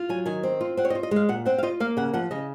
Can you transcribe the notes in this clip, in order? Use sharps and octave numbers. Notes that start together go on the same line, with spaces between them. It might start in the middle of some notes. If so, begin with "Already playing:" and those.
Already playing: F4
F#3 G#5
D#3 G#5
C4
F4
C4 F#5
C#5
D#5
F4
D#5
G#3 F5
A#2 F#5
C4 F#5
F5
F4 D#5
A#3 F5
C#3 F#5
F3 F#5
C#3 D#5